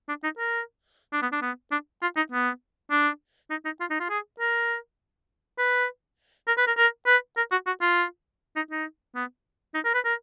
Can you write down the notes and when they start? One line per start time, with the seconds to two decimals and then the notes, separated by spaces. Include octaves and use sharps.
0.08 D4
0.24 D#4
0.38 A#4
1.13 D4
1.22 B3
1.32 D4
1.42 B3
1.72 D4
2.02 F4
2.16 D#4
2.32 B3
2.91 D4
3.51 D#4
3.65 D#4
3.80 F4
3.90 D#4
4.00 F4
4.10 G#4
4.40 A#4
5.58 B4
6.48 A#4
6.58 B4
6.67 A#4
6.77 A#4
7.07 B4
7.37 A#4
7.51 F#4
7.67 F#4
7.81 F4
8.56 D#4
8.71 D#4
9.15 B3
9.75 D#4
9.85 A#4
9.94 B4
10.05 A#4